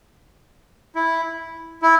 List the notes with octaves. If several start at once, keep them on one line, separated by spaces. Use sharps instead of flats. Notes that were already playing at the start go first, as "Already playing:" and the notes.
E4
E4